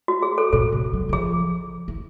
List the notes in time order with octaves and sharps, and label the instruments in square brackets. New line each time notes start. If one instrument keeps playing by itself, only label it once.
[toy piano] F#4
G#4
A4
[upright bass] A#2 [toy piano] A4
[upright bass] C3
F#3
E3
[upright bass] F3 [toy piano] G#4
[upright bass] E3